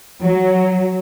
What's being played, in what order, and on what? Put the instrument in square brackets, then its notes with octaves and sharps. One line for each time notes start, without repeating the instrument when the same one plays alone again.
[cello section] F#3